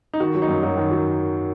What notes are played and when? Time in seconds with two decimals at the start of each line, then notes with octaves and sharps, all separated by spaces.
0.14 D#4
0.20 D#3 F#4
0.35 F#3
0.42 D#4
0.48 F#2
0.63 F#2 F#4
0.77 D#3
0.91 F#3